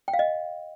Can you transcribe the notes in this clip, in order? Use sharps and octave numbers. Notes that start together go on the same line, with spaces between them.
G5
F5
D#5